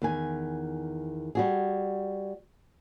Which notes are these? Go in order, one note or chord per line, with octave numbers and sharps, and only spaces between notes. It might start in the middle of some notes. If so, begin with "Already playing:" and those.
E2 D#3 G#5
G3 F#4 G#4